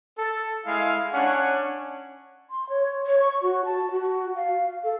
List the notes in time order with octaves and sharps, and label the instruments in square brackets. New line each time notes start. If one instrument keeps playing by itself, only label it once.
[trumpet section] A4
G#3 E4 F5
C#4 D4 C#5 F#5
[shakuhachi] C6
C#5
C#5
C#6
F#4
A5
F#4
F5
A4